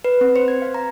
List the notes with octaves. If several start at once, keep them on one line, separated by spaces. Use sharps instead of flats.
B4
C4
C5
G#6
F5
A#5